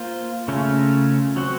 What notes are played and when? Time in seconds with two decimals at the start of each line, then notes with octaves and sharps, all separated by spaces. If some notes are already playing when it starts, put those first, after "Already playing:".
Already playing: A#3 F4 C5
0.48 C#3 A3 C#4 F4 A#4
1.36 F#3 C4 F#4